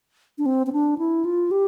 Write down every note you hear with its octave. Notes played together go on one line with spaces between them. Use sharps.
D4
C4
C4
D4
E4
F4
G4